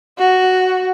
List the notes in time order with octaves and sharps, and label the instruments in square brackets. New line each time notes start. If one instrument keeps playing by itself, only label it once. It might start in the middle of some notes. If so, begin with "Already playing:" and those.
[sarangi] F#4